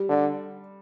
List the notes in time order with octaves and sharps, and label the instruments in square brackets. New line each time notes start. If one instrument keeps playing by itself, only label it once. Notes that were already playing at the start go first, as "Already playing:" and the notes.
Already playing: [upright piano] G3
[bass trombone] D3